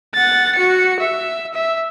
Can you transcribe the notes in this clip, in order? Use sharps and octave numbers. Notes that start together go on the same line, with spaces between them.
F#5 A6
F#4 C#7
E5
E5